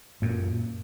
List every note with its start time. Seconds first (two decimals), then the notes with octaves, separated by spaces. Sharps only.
0.22 F#2 A#2